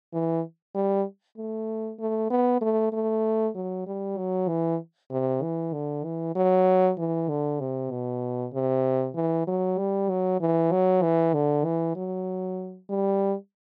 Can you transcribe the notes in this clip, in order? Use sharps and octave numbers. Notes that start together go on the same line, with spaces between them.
E3
G3
A3
A3
B3
A3
A3
F#3
G3
F#3
E3
C3
E3
D3
E3
F#3
E3
D3
C3
B2
C3
E3
F#3
G3
F#3
E3
F#3
E3
D3
E3
F#3
G3